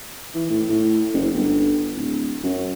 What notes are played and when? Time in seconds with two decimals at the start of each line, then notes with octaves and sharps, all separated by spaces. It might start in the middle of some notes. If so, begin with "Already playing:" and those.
0.34 E3
0.50 A2
0.69 A2
1.13 F#1
1.34 G1
1.97 D1
2.43 F#2